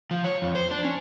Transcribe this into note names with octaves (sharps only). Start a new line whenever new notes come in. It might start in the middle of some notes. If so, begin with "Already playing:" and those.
F3
C#5
F2
C5
D4
C#4